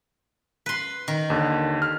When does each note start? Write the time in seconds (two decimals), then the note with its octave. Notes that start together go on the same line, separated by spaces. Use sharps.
0.66 B4 C6
1.08 D#3
1.30 D#2 D3
1.82 F6